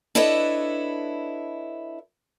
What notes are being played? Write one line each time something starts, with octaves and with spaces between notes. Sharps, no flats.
D4 E4 A4 B4 C#5 D#5